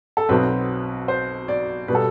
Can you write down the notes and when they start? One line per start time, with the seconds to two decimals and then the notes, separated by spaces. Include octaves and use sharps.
0.17 A4
0.29 B1 B2 F#3 C4 B4
1.08 C5
1.48 D5
1.88 B2 G3 B4
1.95 A4